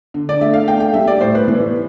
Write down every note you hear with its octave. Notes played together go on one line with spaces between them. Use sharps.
D3
D5
A3 E5
F5
A3 G5
G5
G3 E5
D5
A2 C5
B4
E3 B4